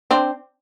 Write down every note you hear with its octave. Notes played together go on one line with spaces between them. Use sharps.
C4 D4